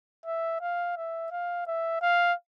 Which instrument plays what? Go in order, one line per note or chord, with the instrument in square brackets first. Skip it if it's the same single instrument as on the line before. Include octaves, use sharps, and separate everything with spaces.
[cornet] E5
F5
E5
F5
E5
F5